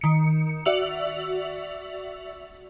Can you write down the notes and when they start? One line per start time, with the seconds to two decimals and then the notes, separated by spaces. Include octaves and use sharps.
0.01 D#3 C#7
0.65 F#4 D5 E5 E6 F7 F#7